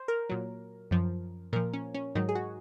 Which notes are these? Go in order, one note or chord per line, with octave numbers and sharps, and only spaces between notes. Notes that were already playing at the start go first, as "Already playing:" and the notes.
Already playing: C5
A#4
A#2 F#3
F#2 F3
A#2 F3 A#4
C#4
C#4
G#2 D#3 F#3 D#4
G#4
F#4